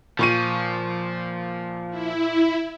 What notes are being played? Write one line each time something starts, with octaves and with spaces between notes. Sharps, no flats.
A#2 F3 C#6 D#7
E4